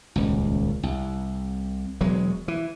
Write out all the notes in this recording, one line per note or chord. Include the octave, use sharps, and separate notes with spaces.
D#1 C#2
C2
E1 F#3 G#3
E3